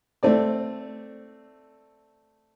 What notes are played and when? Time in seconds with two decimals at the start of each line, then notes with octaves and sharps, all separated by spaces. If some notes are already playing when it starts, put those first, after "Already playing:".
0.23 A3 C4 D5